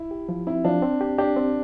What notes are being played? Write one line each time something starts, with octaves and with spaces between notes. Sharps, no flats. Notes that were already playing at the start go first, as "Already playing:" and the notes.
Already playing: E4
G4
F3
C4 E4
F3 D4
C4
G4
D4 G4
C4